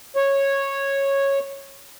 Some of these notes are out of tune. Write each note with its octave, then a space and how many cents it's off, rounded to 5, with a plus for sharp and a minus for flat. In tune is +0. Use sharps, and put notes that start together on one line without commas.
C#5 -10